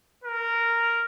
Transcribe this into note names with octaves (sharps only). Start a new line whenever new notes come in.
A#4